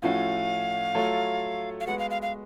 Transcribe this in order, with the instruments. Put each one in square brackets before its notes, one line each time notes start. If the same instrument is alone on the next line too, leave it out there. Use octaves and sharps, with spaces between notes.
[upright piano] A2 F3 A3 C#4 F#4 [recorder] F5
[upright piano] F#3 A3 F4 A4 C#5
[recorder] F5
[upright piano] G#3 B3 F#4 B4 [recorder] F#5
[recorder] F5
F5
F5